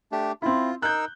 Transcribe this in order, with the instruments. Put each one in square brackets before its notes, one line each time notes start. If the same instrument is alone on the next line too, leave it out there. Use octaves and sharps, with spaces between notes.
[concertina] A3 D4 G4
[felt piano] C4 E4 [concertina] F4
[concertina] D#4 A#4 E6 [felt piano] F#6 G6